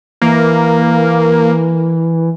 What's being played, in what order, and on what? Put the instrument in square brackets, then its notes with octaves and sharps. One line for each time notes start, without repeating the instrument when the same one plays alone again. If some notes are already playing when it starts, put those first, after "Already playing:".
[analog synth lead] E3 [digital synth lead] A#3